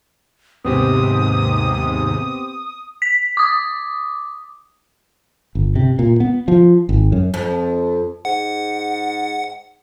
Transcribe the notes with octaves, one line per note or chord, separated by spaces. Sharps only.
D#2 G#2 C3 B3 C4 G4 D#6
B6
D6 D#6
G1
C3
A#2
B3
F3
G#1
F#2
F2
G#2 F#5